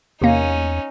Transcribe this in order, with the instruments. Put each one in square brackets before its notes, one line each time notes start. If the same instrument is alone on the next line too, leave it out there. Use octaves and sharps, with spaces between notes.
[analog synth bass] E2 [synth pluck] C3 A#3 [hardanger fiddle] C#4 D#4